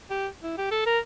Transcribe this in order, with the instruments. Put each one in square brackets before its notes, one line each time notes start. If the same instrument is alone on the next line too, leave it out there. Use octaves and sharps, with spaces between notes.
[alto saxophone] G4
E4
G4
A4
A#4